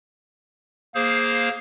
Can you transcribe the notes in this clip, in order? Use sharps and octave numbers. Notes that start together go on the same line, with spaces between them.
A#3 G#4 C5 F5